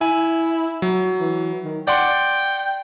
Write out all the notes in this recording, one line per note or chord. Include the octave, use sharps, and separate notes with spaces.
E4 G#5
F#3
E3
D#3
D5 F#5 G5 C6